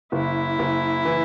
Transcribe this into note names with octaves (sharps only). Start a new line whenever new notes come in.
F#1 E4
F#1
E3